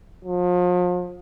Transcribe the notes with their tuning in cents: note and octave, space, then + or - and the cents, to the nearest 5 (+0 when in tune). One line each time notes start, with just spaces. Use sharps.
F3 +35